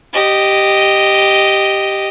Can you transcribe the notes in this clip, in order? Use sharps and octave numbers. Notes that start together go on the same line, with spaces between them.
G4 D#5